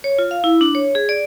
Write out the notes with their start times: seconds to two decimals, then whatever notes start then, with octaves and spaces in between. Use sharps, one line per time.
0.04 C#5
0.19 F4
0.31 F5
0.44 E4
0.61 D4
0.75 C#5
0.95 G#4
1.09 D5